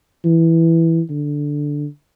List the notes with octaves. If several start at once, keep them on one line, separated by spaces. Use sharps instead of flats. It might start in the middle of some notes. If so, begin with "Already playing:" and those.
E3
D3